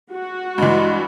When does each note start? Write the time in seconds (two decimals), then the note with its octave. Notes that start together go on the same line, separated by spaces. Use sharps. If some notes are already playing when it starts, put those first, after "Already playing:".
0.13 F#4
0.58 G2 E3 G#3